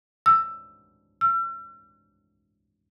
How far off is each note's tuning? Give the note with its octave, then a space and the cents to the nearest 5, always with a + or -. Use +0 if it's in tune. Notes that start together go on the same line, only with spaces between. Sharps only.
E6 +15
E6 +45